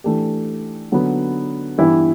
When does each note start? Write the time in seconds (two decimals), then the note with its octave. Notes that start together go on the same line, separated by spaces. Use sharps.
0.04 E3 A3 D4 G4
0.92 D3 F#3 B3
1.78 G2 E3 B3 E4 G4